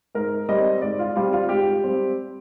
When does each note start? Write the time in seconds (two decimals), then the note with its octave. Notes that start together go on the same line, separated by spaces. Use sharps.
0.15 G#2 A#4
0.49 G3 C4 D#5
0.82 G#2 D5
0.99 F4
1.16 G3 C4 F4
1.33 F4
1.49 G#2 G4
1.84 G3 C4